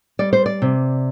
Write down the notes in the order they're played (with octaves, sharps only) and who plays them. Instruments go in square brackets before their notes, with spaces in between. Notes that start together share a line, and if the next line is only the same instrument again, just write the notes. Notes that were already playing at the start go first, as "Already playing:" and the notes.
[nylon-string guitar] G3 D5
C5
D5
C3